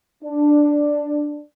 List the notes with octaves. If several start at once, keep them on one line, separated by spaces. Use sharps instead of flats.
D4